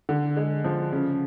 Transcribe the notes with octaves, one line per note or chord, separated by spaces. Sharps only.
D3
G#3
F3
C#3